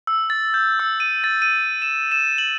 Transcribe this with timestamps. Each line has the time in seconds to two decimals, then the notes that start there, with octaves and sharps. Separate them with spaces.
0.07 E6
0.30 A6
0.54 G6
0.79 E6
1.00 D#7
1.24 A6
1.42 D#7
1.82 E7
2.12 E7
2.38 F#7